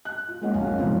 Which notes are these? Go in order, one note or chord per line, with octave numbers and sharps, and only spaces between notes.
F#6
F4
G#3 A#3 C#4 D#5 F#5
B1 C#4 F5 G#5
F1 G#2 C4 F4